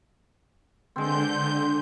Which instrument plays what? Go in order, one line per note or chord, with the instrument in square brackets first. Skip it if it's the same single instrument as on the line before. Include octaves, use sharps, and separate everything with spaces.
[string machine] D3 G6 [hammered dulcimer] G#3 C4